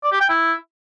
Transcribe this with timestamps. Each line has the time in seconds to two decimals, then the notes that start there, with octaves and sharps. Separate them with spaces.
0.04 D5
0.12 G4
0.21 G5
0.29 E4